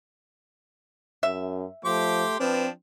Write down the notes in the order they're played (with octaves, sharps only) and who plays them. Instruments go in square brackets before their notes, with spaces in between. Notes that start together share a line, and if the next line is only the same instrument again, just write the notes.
[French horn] F#2 [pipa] E5
[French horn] F3 [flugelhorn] A3 [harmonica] G4 C6 D6
[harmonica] F3 D4 [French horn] C4 [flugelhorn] B4